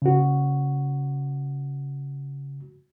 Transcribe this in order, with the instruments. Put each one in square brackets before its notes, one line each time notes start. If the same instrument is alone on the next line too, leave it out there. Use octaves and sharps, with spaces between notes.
[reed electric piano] C#3 F#4